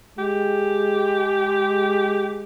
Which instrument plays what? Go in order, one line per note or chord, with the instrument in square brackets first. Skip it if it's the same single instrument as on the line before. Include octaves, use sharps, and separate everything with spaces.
[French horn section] G#3 [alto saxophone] G4